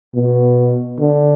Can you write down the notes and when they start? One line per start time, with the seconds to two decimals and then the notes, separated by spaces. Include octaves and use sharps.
0.15 B2
1.00 D3